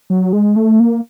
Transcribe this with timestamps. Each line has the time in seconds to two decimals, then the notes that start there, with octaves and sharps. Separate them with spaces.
0.10 F#3
0.33 G#3
0.56 A3
0.80 A#3